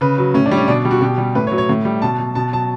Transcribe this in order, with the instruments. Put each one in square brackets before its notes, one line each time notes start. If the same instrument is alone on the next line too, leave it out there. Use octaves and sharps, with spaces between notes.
[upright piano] C#3 B4
F#3
A2 C#4
D4
G3
C#4
B2 D4
G3
F#4
B2 G4
G3
A2 B4
C#5
F#3
C#5
A2
G3
B2 A5
F#3
B2 A5
F#3 A5